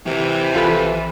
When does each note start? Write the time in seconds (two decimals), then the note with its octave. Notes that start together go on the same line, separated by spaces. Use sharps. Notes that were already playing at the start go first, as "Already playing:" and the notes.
0.06 C3 E3
0.55 A#1 F4 A4 B4